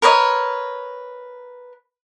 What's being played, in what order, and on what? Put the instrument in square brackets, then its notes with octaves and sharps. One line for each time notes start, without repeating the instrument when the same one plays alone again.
[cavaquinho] A#4 B4 C#5 D#5